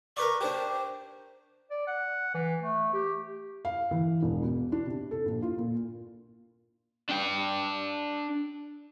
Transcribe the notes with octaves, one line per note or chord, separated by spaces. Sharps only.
A#4 B4 D5 C#6
D4 G4 C5
D5
F#5
E3
A3
G4
F5
E3
E1
B2
D4
C3
A4
A#1
F4
A#2
D4 G5